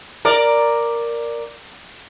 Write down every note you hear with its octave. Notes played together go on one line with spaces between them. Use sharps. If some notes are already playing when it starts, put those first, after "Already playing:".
A#4 D5